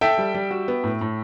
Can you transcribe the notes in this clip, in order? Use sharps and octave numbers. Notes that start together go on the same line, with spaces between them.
A4 E5 G5
G3
G3
F#4
B3
A2
A2